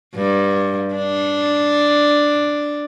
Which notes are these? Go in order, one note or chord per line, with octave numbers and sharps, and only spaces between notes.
G2
D4